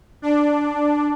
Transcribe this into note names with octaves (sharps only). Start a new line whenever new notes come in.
D4